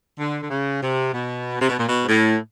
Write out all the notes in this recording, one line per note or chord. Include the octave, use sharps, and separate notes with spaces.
D3
D3
C#3
C3
B2
C3
B2
A#2
B2
G#2
A2